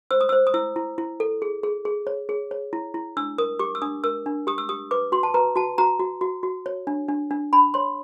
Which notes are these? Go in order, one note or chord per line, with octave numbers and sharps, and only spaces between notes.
C5 E6
D#6
E6
C5
D#6
E4 E6
E4
E4
A4
G#4
G#4
G#4
C#5
G#4
C#5
E4
E4
D4 E6
A#4 D#6
G4 D6
E6
D4 D#6
A#4 E6
D4
G4 D#6
E6
G4 D#6
B4 D6
F#4 C6
A5
B4 A#5
F#4 A5
F#4 A#5
F#4
F#4
F#4
C#5
D4
D4
D4
D4 B5
C#5 C6